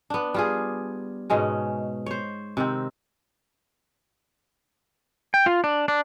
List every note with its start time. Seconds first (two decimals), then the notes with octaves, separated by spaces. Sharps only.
0.10 B3 D4
0.34 G3 F4 G#4
1.30 G#2 B2 G#3 C#4
2.06 C5 C#5
2.57 C3 D#3 C4
5.34 G5
5.46 F4
5.64 D4
5.88 D4